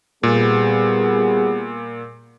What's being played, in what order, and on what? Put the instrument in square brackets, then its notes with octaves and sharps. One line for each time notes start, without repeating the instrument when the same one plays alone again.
[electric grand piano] A#2 [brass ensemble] G3 B3 G#4